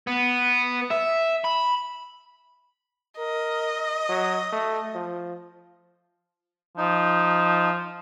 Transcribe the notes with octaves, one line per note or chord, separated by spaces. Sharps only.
B3
E5
B5
A#4 D#5
F#3
A3
F3
F3 D#4